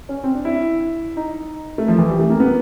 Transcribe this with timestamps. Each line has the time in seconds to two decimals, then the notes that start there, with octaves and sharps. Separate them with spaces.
0.09 C#4
0.24 C4
0.35 D4
0.45 E4
1.17 D#4
1.78 A3
1.88 F3
1.99 E3
2.09 G3
2.19 A3
2.30 A#3
2.40 B3